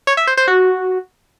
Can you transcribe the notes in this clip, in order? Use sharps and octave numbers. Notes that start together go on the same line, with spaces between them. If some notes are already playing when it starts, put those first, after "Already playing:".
C#5
E5
C5
C5
F#4